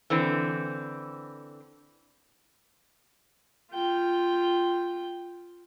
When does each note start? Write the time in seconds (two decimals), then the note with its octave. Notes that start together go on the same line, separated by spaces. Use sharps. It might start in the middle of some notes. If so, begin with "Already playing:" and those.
0.10 D3 E3 C4
3.72 F4 G5